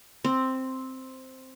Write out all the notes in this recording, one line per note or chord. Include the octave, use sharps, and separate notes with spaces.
C4